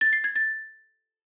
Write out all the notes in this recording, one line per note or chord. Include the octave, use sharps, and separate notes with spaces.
A6
C7
G#6
A6